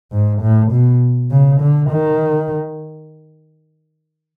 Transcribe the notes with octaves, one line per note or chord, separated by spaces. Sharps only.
G#2
A2
B2
C#3
D3
D#3